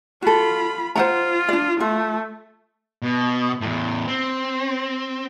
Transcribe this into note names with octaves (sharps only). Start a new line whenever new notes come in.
F4 F#4 A4 B5
F4 C5 F#5 A#5
D4 D5
A3 F4
B2
E2 A2
C4